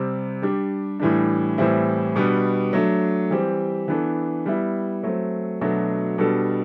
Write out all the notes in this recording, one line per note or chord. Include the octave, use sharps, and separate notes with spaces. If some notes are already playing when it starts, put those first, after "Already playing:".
Already playing: C3 G3 C4
G3 D4 G4
A2 E3 G3 D4
A2 E3 G3 C4 E4
B2 G3 B3 D4
F#3 A3 D4
E3 G3 C4 G4
E3 B3 D4 A4
G3 B3 E4
F#3 A3 C4
B2 F#3 A3 D4
B2 G3 D4 A4